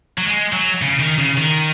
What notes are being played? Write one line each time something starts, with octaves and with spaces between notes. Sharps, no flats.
F#3
G#3
F#3
C#3
D#3
C#3
D#3